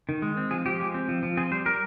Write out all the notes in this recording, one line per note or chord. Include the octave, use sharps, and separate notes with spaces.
D#3
G#3
C4
F3 G#4
F3 G4
G#3
C4
F3
F3
C4 G#4
G3 C5
G3 A#4